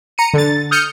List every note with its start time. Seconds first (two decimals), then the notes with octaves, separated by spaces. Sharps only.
0.18 A#5 C#7 D#7
0.34 D3 A6
0.71 D#6 F6 G6 C#7